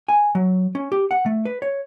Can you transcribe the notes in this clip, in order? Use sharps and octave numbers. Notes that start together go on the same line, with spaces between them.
G#5
F#3
C#4
G4
F#5
A3
B4
C#5